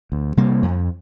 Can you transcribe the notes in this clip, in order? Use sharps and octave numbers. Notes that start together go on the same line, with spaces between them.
D2
C3 G3 A#3
F2